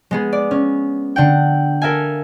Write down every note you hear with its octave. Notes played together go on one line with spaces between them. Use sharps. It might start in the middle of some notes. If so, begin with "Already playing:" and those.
G#3 B3 G#4
D5
C#4
D3 F#5 G5
A4 A#4 E5 F5 G#5